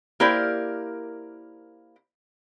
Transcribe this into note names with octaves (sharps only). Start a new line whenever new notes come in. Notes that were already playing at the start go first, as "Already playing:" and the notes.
A#3 E4 G4 A#4 C5 D5